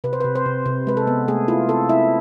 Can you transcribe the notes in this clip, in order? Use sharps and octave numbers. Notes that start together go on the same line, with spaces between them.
C3 B4
C5
C3 B4
C5
C3
C3
G#3 B4
A4
B3
A3 G#4
E4 F4
C4 A4
E4 E5